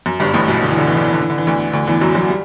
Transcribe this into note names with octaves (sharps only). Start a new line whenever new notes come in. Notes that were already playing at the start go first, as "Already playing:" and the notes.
F#2
G1 G2
A1 A2
B1 B2
D3
E3
D3
E3
D3
E3
D3
E3
D3
E3
D2 D3
D2 D3
E2 E3
F#2 F#3
F#2 F#3
G3